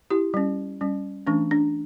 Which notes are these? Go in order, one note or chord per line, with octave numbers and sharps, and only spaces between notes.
E4 G4
G3 C#4
G3 C#4
E3 A3 C#4 D4
D4